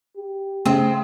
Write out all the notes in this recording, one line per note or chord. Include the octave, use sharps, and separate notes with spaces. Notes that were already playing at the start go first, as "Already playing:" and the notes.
G4
C#3 A3 C4